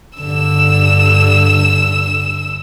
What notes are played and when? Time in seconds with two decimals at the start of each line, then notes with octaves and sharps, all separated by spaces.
0.19 G2 D3 E6 E7